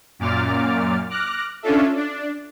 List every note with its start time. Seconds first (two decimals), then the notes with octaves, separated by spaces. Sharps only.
0.19 F#2 A#2 D6 F6 A6
1.10 D6 F6 F#6 A#6
1.62 C#4 D4 F4 A4 E5
1.96 D4